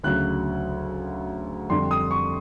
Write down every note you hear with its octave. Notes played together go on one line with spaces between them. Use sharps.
D2 C#3 F#3 F#6
F2 D3 G3 C6
D#6
C#6